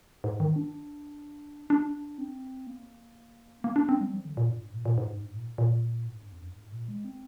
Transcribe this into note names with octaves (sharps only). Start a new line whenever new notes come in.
G#2
D#3
D4
D4
C4
A#3
A#3
D4
C4
G3
F3
D3
A#2
G2
G#2
A#2
A#2
G#2
G2
G#2
A#2
A#2
G#2
G2
F2
G2
G#2
A#2
G#3
C4